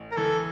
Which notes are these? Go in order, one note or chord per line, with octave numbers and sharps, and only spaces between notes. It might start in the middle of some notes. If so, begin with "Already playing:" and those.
Already playing: A1
A#4
E3 A4